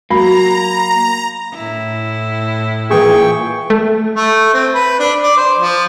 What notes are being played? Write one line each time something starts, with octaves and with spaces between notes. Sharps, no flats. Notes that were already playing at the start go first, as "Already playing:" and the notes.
F#3 A#3 A#5 B5
A2 E4
A#2 E3 G#4 G5 C#6
A3
A3
C4
B4
D4
D5
C5
F3